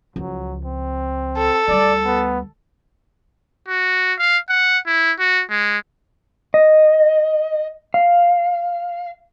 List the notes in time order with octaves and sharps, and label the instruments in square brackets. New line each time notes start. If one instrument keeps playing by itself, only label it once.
[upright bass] C#2 F3 [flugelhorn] F#3
[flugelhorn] C4
[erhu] A4
[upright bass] D2 G3 [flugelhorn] D5
[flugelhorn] B3
[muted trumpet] F#4
F5
F#5
E4
F#4
G#3
[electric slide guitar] D#5
F5